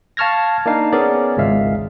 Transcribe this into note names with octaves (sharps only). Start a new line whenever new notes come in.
F5 A5 C#6 F6 G#6 A#6
A#3 D4 D#4 F5 A5
B3 C#4 G#4 A#4 D5
G#1 C#2 G#3 E5 F5